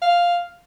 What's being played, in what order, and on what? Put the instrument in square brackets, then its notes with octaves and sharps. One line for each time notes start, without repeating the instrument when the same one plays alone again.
[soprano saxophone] F5